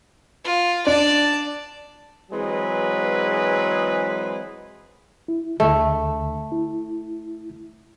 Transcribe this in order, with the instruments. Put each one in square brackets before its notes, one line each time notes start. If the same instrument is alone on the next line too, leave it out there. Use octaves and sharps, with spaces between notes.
[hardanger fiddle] F4
[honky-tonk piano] D4 [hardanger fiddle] D5 A5
[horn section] E3 F#3 G#3 C4 G#4 B4
[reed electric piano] E4
[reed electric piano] D2 D3 [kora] A3
[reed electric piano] E4